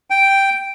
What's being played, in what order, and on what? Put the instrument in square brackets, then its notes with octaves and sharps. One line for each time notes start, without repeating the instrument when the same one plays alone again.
[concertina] G5